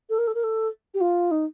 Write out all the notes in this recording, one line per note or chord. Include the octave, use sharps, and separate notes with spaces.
A4
A#4
A4
A#4
A4
G4
F4
D#4